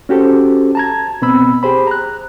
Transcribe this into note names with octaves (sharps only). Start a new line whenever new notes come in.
C#4 F#4 G4 A4 C5
A5 A#5 G#6
B2 B3 C4 B5 E6
G4 G#4 C5 B5
A#5 F#6